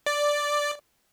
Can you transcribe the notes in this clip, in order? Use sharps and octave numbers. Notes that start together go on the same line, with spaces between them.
D5